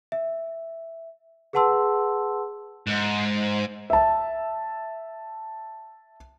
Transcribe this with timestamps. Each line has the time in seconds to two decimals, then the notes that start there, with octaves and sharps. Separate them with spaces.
0.12 E5
1.53 G#4 B4 F#5 A5 C6 E6
2.87 G#2
3.90 E5 A5